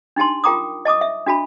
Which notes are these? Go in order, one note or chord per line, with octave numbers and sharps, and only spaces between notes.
D4 D#4 G4 A5 C6
F4 A#4 G5 A#5 D6 D#6
D#5 A5 D6 D#6
E5
D4 F#4 A5 B5